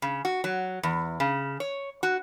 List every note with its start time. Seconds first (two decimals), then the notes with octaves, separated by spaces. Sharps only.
0.02 C#3
0.25 F#4
0.44 F#3
0.83 E2
1.20 C#3
1.60 C#5
2.03 F#4